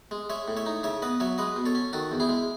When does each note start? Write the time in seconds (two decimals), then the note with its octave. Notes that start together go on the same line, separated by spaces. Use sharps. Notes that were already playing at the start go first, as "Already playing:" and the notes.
0.11 G#3
0.30 G#3 C#5 E5
0.48 A2
0.57 C#5 E5
0.66 D#4
0.83 C#3 C#5 E5
1.02 B3 B4 D#5
1.20 F#3 C#5 E5
1.38 G#3 B4 D#5
1.56 B2
1.66 A4 C#5
1.75 C#4
1.93 D#3 F#4 A4
2.11 E2
2.20 E4 G#4
2.29 G#3